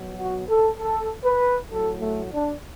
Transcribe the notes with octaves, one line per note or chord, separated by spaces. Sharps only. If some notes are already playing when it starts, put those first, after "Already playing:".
Already playing: B2 F#3
F#4
A4
A4
B4
A2 F#3 A4
A3
D4